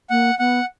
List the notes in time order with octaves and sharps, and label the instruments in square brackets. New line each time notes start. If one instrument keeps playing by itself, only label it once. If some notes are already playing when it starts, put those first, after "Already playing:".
[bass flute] A#3 [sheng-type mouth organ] F#5
[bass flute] B3 [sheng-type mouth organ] F#5